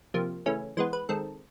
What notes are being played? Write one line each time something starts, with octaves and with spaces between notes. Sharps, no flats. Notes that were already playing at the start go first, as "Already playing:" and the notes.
C3 F3 A#3
C#3 E3 A3 C#4
E3 G#3 B3 C5
B4
D#3 G#3 C4 A4